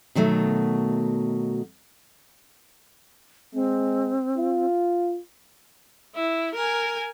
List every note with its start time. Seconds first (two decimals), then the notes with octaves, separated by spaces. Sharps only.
0.15 B2 D#3 F#3 A3
3.54 G#3 C4
4.37 F4
6.15 E4
6.55 A#4 G#5